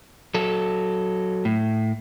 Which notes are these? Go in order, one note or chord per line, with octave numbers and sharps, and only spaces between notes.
F#3 A4
A2